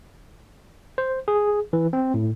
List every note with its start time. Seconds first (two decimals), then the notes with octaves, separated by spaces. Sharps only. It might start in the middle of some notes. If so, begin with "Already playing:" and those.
0.98 C5
1.28 G#4
1.73 E3
1.93 C4
2.14 A2